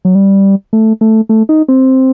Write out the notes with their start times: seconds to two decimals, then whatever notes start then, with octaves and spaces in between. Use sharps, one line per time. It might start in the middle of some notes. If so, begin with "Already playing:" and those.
0.05 F#3
0.15 G3
0.73 A3
1.01 A3
1.29 A3
1.49 D#4
1.68 C4